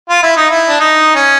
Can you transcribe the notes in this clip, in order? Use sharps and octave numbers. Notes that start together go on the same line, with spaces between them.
F4
E4
D#4
E4
D4
D#4
C#4